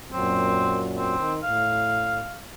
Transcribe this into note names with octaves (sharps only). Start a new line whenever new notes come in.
F#2 A#2 F#3 C4
C4
D#3
A2 F5